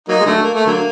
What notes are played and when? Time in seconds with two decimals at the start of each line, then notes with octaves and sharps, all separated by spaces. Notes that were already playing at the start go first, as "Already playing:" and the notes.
0.08 F#3 A#3 D#4
0.19 G#3
0.26 D3 F#3 A3
0.43 A#3
0.55 A3
0.67 D3 F#3 A#3